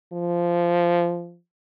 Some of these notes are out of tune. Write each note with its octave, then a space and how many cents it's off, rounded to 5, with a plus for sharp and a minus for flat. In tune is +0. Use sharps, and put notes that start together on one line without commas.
F3 -15